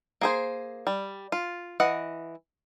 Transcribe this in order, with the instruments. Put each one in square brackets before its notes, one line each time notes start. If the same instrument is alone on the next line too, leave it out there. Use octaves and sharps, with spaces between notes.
[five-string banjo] A#3 G#4 C5
G3
F4
E3 D#5 F#5